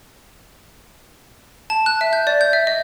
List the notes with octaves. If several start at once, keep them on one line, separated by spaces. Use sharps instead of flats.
A5
F#6
E5
G6
D5
G6
E5
D#5